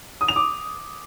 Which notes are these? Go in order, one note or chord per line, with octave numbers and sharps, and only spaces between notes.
D#6
F7
D6